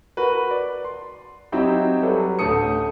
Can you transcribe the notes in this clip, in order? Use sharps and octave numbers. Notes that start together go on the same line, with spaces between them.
F#4 A#4 B4
D5
C6
F#3 C4 D#4 E4 F#4 G4
F#3 G3 A4 B4
A1 D2 A3 A5 D#6 C#7